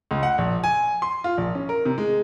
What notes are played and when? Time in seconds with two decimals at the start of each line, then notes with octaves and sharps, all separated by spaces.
0.11 C#2
0.23 F#5
0.38 A#1
0.64 G#5
1.02 C6
1.24 F4
1.38 A#1
1.55 C#4
1.69 A#4
1.85 C3
1.98 G#3